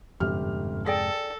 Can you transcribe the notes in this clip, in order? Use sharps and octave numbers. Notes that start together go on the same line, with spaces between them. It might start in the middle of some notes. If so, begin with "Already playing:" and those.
G1 F2 G#2 C3 G4 F6
G#4 A4 D5 G5 A#6